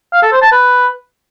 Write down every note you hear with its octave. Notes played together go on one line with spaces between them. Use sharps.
F5
A4
C5
A5
B4